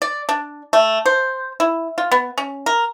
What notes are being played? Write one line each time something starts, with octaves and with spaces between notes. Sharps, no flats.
D5
D4
A3
C5
E4
F4
B3
C#4
A#4